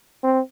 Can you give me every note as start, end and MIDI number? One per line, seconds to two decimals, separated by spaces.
0.24 0.40 60